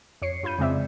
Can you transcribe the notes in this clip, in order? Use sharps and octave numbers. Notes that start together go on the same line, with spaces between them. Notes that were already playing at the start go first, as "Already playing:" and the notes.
F2 C#5 C7 C#7
G2 F4 B5 G6 D#7
F2 C#3 G#3 C4 D5 E5